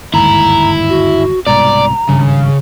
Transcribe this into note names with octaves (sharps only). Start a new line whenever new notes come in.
G1 D#2 G#2 E4 A#5
F#4
C2 G#2 B2 D5 A#5
G#1 G2 C#3